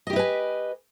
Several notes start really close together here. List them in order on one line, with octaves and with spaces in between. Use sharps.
D#5 G4 E4 B4 G#5